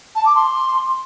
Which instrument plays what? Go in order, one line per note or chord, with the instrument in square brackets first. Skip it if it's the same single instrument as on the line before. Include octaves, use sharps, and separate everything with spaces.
[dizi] A5
D6
C6